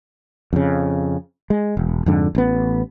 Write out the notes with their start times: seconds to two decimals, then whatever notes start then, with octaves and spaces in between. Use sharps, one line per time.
0.53 F2 C#3
1.50 G#3
1.77 E1
2.06 F2 G#2 D3
2.35 A1 B3